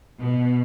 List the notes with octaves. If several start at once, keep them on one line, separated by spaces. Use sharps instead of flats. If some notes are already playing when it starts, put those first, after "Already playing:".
B2